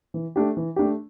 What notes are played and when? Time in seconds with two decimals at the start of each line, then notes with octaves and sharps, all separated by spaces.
0.14 E3
0.36 A3 D4 G4
0.57 E3
0.76 A3 D4 G4